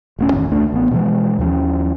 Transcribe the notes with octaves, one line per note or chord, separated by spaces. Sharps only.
D#1 A3 C#4
A1 F2 D#3
C#2 A3 D4
A1 B3
B2 E3 F3 G#3
D#2 F3 C#4